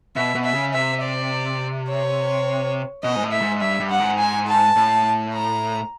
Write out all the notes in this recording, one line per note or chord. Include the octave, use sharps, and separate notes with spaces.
B2 E5
B2
E5
C#3
C3 E5
D5
C#5
B2 D#5
G#2
A2
E5
G#2
G2 E5
G2
F#5
G#2
G#5
A5
A2
A#5